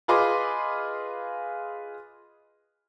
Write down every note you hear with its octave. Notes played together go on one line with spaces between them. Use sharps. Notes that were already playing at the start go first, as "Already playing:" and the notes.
F4 G#4 B4 D#5 C6 D6